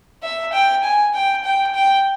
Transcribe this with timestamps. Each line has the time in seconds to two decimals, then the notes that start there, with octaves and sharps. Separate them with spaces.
0.23 E5
0.53 G5
0.84 G#5
1.14 G5
1.44 G5
1.75 G5